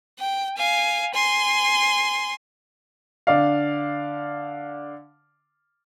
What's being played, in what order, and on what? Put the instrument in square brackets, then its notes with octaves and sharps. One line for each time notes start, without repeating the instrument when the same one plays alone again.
[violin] G5
F5 G#5
G#5 C6
[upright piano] D3 D5 F5